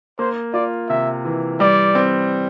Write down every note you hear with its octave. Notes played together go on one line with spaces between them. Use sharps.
A#3 C5
F4 D5
C3 E5
E3
G3 D5
C4